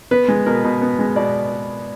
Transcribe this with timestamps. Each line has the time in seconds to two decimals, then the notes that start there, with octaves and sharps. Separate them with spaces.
0.11 B3 B4
0.28 G#3
0.46 B2 A#4
0.64 B2
0.81 B3
0.99 G#3
1.16 B2 D5